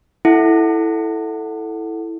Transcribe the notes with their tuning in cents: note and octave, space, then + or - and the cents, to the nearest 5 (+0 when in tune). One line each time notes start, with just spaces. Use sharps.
E4 -5 A4 +0 F#5 +0